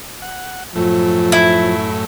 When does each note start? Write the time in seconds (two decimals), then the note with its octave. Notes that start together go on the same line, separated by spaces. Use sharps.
0.22 F#5
0.76 F#2 A2 F3 A3
1.32 E4